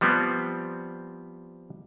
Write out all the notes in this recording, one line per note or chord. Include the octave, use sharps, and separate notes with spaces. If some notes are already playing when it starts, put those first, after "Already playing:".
F3 G3 B3 C4